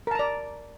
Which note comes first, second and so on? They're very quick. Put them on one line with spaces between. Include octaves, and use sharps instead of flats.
A#4 A5 A#5 D5